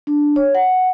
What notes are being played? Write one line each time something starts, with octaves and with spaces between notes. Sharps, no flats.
D4
C#5
F#5